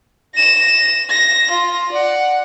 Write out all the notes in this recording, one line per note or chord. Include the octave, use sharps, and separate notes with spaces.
A#6 E7
A#6
F4
D5 F#5